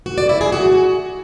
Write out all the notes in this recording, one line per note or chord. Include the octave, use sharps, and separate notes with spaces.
F#4
D5
E4
G#4
F#4